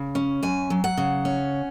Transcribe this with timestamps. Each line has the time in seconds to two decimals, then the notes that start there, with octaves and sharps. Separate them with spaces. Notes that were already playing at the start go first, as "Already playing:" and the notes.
Already playing: C#3
0.15 C#4
0.43 F#2 G#5
0.70 F#3
0.84 F#5
0.98 C#3
1.25 C#4